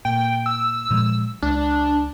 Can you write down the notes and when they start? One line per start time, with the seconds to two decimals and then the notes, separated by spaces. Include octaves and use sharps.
0.05 A#2 G5
0.46 E6
0.90 A#2 F3 G#3
1.42 C#2 D4